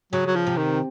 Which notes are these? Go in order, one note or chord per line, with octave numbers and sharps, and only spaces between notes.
C#3 F#3
F#3
F3
C3
D#3